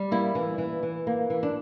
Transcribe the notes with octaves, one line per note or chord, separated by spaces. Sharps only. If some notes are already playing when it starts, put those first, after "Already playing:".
Already playing: G3
A#3 E4
E3
E3
E3
A#3
E3
D4